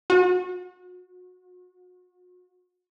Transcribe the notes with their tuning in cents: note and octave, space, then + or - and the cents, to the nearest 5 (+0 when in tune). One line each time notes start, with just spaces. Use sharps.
F#4 -40